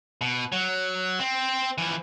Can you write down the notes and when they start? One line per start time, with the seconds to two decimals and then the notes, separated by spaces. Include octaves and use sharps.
0.21 B2
0.52 F#3
1.19 C4
1.78 E3 F3